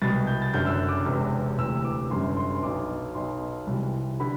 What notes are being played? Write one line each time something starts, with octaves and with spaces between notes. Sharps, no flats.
C2 B2 A6
G6
A6
F#1 F#2 D3 G6
E6
F#6
D6
E1 E2 C3 E3
D2 C3 E3 E6
D6
G1 F#2 D3 C6
C6
C6
B1 B2 D6
B1 B2 C6
C2 C3 E3
D3 B5